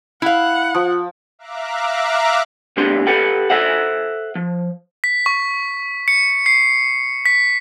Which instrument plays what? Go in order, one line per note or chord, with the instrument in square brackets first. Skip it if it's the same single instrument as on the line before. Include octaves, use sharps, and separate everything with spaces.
[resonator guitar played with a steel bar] E4 F5 [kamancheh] F#5
[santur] F3
[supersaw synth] E5 F5 A#5 D6 F#6
[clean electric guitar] C2 A3 B3 D4 G4 C6
G4 A4 B4 F#5 G5
A4 C5 E5 F#5
F3
[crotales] B6
C#6
C#7
C7
B6